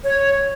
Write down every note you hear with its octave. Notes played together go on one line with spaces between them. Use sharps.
C#5